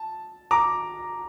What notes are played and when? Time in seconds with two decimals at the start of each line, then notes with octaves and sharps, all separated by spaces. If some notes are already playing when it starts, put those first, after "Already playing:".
Already playing: A5
0.51 A#5 D6